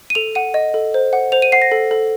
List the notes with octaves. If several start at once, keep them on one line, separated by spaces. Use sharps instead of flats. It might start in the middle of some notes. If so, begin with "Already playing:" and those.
D#7
A4 F7
F#5 D#7
D#5
A4
C5
F#5
C5 F7
D#7
F#5 C7
A#6
A4
A4